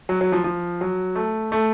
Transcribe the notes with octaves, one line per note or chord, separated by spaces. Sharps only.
F#3
F#3
F3
F3
F#3
A3
A3